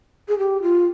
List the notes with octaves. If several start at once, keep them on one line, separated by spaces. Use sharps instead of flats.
G#4
G4
F4